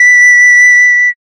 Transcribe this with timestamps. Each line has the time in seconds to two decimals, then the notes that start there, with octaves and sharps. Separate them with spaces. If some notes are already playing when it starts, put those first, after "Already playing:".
Already playing: B6